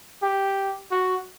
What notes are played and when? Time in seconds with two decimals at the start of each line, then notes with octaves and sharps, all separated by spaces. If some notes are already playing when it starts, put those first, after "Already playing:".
0.23 G4
0.91 F#4